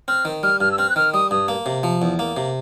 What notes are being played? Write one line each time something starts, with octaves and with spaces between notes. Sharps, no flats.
C4 F6
D#3
G3 F6
G2 F6
E6
C4 F6
F#6
D#3 F6
G3 D#6
G2 D#6
A#3
C3
F3
E2
A#3
C3